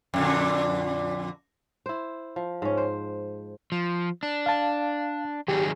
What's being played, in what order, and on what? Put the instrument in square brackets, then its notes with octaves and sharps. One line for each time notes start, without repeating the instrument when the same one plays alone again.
[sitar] F2 A#2 D3
[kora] E4 C5
F3
G#2 C#4
C5
[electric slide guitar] F3
D4
[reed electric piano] F5 A5
[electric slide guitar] D#3 F#3 G#4 [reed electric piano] G4